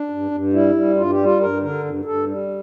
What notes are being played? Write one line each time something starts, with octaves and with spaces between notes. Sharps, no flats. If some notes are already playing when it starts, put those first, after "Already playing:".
Already playing: D4
G2
G2
G3 E4
G3
G2 F4
G4
G3
F4
G2 A#4
D3 A#4
G2
G2 A4
G3